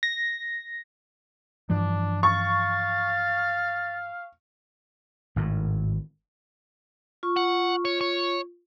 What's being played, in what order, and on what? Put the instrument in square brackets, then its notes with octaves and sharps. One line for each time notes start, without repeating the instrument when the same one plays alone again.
[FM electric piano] A#6
[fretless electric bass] G2 E3 F3 [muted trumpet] D4
[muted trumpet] F5 [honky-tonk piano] C#6 [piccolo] A6
[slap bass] G#1 A2
[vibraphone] F4 C#6
[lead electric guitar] F#5
C#5
C#5